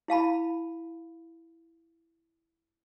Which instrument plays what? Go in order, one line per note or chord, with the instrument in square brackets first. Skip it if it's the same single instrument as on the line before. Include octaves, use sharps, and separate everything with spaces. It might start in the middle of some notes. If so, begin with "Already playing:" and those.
[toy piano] E4 F5 A5 B5